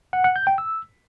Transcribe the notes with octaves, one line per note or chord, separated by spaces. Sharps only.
F#5
F#5
G6
G5
E6